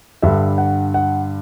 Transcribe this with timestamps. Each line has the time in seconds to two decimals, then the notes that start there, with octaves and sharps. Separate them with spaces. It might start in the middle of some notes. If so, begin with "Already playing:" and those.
0.22 G2 D3 G3 E5
0.58 F#5
0.94 F#5